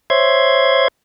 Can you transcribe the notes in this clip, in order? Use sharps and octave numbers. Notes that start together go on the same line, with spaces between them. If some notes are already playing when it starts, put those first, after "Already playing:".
C5 C#5 E5 C6 G#6